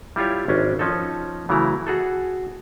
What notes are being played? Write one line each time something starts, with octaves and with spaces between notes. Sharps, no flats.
G3 E4 F4 G4 C#5
G#1 C#4 D4
F3 C#4 D#4 A4
C#3 E3 F#3 A3 E4 A#5
F#4 G#4 A4